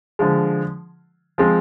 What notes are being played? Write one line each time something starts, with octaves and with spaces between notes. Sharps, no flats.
D3 F3 G#3
F3 G#3 C4